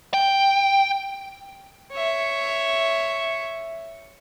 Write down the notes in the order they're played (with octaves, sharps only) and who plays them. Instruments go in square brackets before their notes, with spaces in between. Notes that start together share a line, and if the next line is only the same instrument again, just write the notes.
[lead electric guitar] G5
[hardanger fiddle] C#5 E5